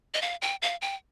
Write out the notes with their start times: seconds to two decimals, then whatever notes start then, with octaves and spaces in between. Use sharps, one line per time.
0.14 D#5
0.22 F5
0.42 G5
0.62 F5
0.82 G5